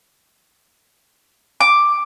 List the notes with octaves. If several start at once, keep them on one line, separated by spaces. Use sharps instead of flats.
D6